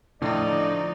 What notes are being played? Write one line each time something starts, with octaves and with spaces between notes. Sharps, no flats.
A2 D3 F3 D#4 F4 D5